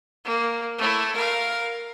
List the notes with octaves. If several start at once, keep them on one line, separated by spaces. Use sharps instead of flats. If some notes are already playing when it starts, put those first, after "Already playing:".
A#3
A3 E4
A#4 F5